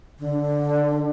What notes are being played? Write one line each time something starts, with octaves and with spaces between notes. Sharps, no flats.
D3